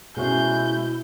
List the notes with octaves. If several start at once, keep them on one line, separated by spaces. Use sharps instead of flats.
B2 G#3 C#4 E4 C5 E5 G6